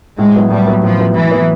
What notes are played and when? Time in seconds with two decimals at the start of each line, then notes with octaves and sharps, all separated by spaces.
0.18 A2 G#3
0.34 F#3 B3 E4
0.50 A2 G3
0.67 F#3 B3 E4
0.83 A2 F3
0.99 F#3 B3 E4
1.15 A2 E3
1.31 F#3 B3 E4